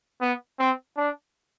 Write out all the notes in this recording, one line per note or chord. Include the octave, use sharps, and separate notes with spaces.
B3
C4
D4